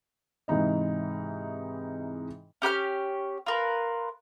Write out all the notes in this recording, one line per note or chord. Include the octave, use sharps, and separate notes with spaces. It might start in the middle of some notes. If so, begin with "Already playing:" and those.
G#2 C3 E3 D#4 D#5
C#4 G4 B5 F6
F4 A#4 B4